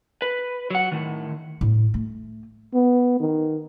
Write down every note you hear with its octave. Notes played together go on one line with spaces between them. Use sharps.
B4
F#3 F#5
A2 D#3
A2
A3
B3
D#3